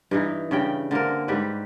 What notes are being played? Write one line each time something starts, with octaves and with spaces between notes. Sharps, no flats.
G2 E3 D#4
G2 C#3 D5 G5
D3 A#3 C4 A#4
G#2 G3 G4 B4